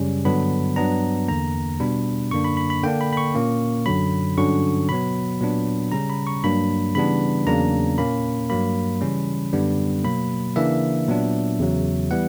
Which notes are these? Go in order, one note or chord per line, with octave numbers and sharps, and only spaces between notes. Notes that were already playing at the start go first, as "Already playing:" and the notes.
Already playing: F#2 C#3 G3 C#4
G2 D3 F#3 B3 D4 B5
G2 F#3 B3 D4 A#5
E2 D3 A#3 A#5
B2 G3 B3 D4 B5
F#2 D3 A#3 D4 C#6
B5
B5
B5
D3 A#3 D4 G5
B5
B5
C#6
A#2 A#3 C#4
F#2 D3 F#3 B5
G2 D3 F#3 C#4 C#6
B2 F#3 B3 B5
A#2 F#3 B3 D4
C#3 G3 C#4 A#5
B5
C#6
G2 F#3 A#3 D4 B5
C#3 E3 G3 B3 D4 B5
E2 C#3 F#3 A#3 D4 A#5
A#2 A#3 C#4 B5
G2 F#3 A#3 B5
C#3 E3 G3 C#4
F#2 D3 G3 B3 D4
B2 F#3 A#3 B5
C#3 E3 A#3 D4 E5
A#2 F#3 B3 D4
E2 C#3 F#3
E3 G3 B3 F#5